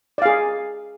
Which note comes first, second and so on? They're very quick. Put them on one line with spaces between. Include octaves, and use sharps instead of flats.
D5 F5 G#4